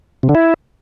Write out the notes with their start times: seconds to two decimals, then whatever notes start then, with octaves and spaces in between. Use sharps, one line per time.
0.23 C3
0.29 D3
0.35 E4